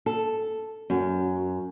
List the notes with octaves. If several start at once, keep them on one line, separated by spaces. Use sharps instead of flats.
A4
F#2